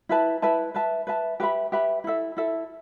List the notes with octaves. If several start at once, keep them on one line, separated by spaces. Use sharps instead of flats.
E4 B4 E5 A5
E4 B4 E5 A5
B4 E5 A5
B4 E5 A5
G4 B4 E5 B5
G4 B4 E5 B5
E4 A4 E5
E4 A4 E5